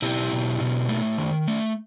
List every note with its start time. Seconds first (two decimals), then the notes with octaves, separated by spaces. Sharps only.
0.02 B2 E4 G4
0.32 B2
0.60 B2
0.89 A3
1.18 D#3
1.48 A3